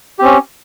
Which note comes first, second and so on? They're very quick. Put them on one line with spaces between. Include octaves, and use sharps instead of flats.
G4 C4 C#4